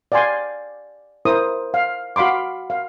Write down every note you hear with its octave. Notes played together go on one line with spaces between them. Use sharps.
D5 F5 G5 G#5 C6
E4 A#4 C5 D#6
F5
F#4 F5 B5 C6 D6
F5